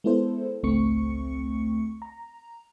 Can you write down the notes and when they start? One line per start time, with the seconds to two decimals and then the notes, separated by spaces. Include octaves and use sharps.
0.04 G#3 B3 E4 A4 C5
0.63 G#1 C#2 A3 C4 C#6 C#7
2.02 A#5